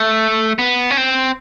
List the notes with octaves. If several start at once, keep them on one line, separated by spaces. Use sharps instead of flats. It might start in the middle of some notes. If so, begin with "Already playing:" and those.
Already playing: A3
B3
C#4
C4